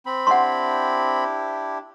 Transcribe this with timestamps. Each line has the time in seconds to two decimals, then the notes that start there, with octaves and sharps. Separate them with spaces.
0.06 C4 B5
0.27 D4 E4 G4 F#5 C6